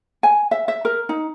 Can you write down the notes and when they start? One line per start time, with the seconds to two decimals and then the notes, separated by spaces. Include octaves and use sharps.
0.23 G#5
0.51 E5
0.68 E5
0.85 A#4
1.09 D#4